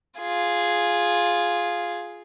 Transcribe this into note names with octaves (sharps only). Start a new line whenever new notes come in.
F4 G#4